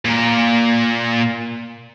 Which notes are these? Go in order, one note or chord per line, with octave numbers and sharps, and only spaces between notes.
A#2 A#4